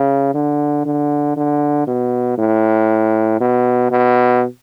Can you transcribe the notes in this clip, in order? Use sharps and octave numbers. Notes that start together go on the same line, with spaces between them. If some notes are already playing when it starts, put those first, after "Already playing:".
Already playing: C#3
D3
D3
D3
B2
A2
B2
B2